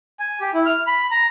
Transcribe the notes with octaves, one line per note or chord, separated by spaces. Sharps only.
G#5
G4
E4
F6
B5
A#5